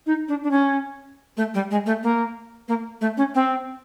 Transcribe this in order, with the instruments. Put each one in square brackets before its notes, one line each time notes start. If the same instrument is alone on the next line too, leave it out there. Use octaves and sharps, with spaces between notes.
[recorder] D#4
D4
D4
C#4
A3
G3
G#3
A3
A#3
A#3
A3
C#4
C4